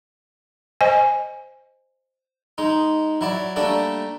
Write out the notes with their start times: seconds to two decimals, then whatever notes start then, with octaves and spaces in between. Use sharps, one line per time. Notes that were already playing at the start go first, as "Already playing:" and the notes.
0.81 C5 D#5 G#5
2.58 G#3 D#4
3.21 F#3 E4 D5
3.56 G3 A3 A#3 D4 A4